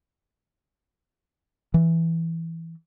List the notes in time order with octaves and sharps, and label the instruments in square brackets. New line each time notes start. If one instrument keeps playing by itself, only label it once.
[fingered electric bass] E3